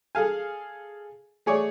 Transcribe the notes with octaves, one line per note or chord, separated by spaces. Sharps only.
G#4 A4 F5 G#5
A3 G#4 C#5 D5